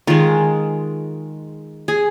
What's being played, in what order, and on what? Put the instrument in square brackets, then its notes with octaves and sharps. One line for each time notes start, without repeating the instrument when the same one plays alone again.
[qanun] D#3 G#3 F4
G#4